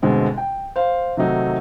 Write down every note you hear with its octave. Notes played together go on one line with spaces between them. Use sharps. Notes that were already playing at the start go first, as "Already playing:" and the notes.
G1 B2 D3 G#3 C4
G5
C5 F5
C3 D#3 F#3 A3 D#4 F#4